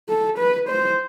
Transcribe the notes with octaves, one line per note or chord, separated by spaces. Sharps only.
A4
B4
C5